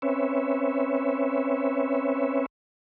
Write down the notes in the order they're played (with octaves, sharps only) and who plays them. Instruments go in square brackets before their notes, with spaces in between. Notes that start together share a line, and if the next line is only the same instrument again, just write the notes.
[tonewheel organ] C4 C#4 B4 C#5 E5